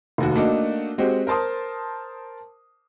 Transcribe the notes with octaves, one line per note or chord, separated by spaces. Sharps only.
F1 D#2 F#4
A3 A#3 D4 D#4 F#4
G#3 C4 F#4 G4
A#4 C5 A5 C6 D#6